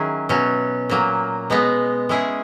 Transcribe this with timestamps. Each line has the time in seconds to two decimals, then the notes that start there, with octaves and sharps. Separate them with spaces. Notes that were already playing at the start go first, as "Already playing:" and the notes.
Already playing: D#3 F#3 C#4 E4 G#4
0.29 B2 F#3 C#4
0.90 A#2 F#3 A#3
1.50 B2 G#3 B3
2.09 G#3 C#4 E4 G#4